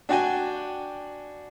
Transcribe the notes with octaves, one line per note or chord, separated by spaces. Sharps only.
D4 F#4 D5 G5 G#5